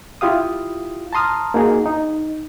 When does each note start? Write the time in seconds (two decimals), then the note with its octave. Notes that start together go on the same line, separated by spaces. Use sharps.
0.21 E4 F4 G4 F5 D#6
1.13 A5 A#5 C6 D#6 F6
1.54 A#3 D#4 F#4 G#4
1.86 D#4